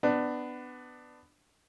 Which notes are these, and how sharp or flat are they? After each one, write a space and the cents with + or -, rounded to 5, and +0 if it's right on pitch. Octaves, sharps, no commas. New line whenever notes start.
B3 +15 D4 +15